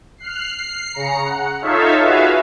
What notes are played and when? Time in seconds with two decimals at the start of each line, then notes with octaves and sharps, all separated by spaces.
0.18 F6 F#6 C7
0.53 C7
0.92 C#3 A#5 C#7
1.25 F#5
1.62 D#4 F4 A4 C#5 E5 F5
2.00 F#4 G#4 B4 E5 F5